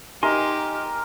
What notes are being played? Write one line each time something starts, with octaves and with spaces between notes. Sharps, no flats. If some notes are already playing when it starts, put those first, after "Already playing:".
D#4 G4 A#4 D#5 G#5 C6